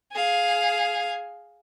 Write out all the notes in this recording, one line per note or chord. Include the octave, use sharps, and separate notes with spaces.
G#4 F5